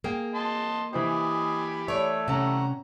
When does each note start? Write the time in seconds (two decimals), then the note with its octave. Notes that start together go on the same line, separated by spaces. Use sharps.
0.04 A#3 G#4 G5
0.35 D#5 A5 C6
0.93 E3 E4 G4 C5 D#5 G#5 B5
1.88 A3 C#5 D5
2.28 C3 C#4 F#5 A#5